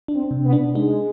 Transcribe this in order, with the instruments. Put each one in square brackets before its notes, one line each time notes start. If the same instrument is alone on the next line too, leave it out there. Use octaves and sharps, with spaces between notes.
[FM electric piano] D4
[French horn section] C4
[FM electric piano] C3
[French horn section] B3
[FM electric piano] D4
[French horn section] G#3 [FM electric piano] D#4